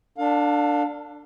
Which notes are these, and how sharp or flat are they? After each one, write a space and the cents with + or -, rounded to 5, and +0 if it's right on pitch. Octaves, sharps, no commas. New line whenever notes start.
D4 +0 A4 +40 F5 +30